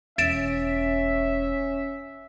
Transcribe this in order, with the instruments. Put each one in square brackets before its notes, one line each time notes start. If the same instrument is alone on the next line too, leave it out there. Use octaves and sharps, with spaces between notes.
[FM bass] E1 [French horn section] C#4 [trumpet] E5 [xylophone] A6 D7 E7